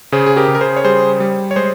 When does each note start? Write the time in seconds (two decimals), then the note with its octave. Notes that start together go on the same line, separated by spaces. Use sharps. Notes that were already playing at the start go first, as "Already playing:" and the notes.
0.12 C#3 G#4 C5
0.26 G#4
0.36 G4 A#4
0.48 C#3
0.55 A#4
0.61 G#4 C5
0.77 C#5
0.84 G3 G#4 C5
1.20 G3
1.51 C#5
1.56 G#3 G#4 C5